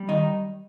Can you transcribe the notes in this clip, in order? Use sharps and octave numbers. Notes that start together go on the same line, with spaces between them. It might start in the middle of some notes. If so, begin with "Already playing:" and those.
Already playing: G3
D#3 D#4